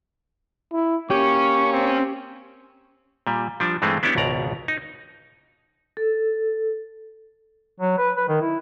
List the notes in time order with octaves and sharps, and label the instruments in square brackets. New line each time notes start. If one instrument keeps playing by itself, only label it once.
[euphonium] E4
[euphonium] A#3 [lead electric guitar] C#4 [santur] G4 [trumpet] C#6
[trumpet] C4
[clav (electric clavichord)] A#2 G3
F3 G3 D4
G2 E3 G#3 A3 C4
B3 C#4 D4 E4 G4
G#1 C#2 B2 D5 A#5
D#4
[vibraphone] A4
[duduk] F#3
B4
B4
D#3
E4